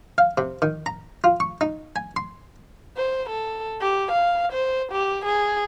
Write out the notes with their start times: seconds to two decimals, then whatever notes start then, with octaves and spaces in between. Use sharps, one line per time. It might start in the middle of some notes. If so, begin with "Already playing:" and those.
0.18 F5
0.38 C3
0.62 D#3
0.86 A#5
1.24 F4
1.40 C#6
1.61 D#4
1.96 G#5
2.16 C6
2.97 C5
3.29 A4
3.81 G4
4.12 F5
4.53 C5
4.92 G4
5.25 G#4